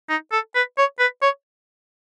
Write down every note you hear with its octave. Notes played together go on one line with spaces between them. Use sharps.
D#4
A4
B4
C#5
B4
C#5